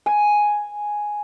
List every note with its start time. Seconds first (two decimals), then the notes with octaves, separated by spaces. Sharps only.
0.06 G#5